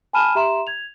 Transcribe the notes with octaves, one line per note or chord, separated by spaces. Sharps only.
G#5 A5 B5 F6 D#7 E7
G4 E5 A#5 C6 E7
G#6 F7